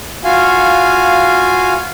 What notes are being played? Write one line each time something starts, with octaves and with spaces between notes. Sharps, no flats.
F4 F#4 F5 G#5